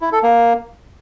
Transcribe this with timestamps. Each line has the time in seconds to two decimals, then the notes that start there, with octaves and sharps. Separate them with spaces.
0.01 E4
0.12 A4
0.23 A#3